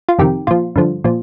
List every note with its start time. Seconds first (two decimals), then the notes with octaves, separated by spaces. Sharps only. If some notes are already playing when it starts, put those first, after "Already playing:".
0.09 F4
0.19 F2 C3 D#3 G4
0.47 A#2 F3 F4
0.76 G2 D3 F3
1.04 A#2 F3